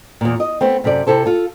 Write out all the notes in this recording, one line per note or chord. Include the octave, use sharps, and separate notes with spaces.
E2 A#2
D#5
A3 B3 C4
F#2 C3 A4 D5
C3 E4 A4 C5
F4 A4